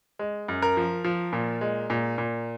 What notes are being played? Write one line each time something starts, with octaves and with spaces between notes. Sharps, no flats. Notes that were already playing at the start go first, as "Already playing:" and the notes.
G#3
F#2
A#4
F3
F3
A#2
G#3
A#2
A#2